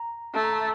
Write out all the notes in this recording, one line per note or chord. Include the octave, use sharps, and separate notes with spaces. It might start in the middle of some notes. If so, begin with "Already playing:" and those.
Already playing: A#5
A3 A5
A#5
A5